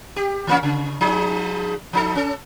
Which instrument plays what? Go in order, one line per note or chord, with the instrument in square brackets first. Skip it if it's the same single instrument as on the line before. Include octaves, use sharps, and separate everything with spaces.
[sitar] G4
E3 A#3 C#4
C#3
F3 D#4 G#4
F3 D#4 A4
C#4 A4